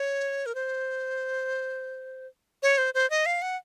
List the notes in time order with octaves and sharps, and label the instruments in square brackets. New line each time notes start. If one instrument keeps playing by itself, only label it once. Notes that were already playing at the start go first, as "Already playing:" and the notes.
Already playing: [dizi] C#5
A#4
C5
C#5
C5
C5
D#5
F5
F#5